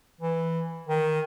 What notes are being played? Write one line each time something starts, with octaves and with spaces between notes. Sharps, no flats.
E3
D#3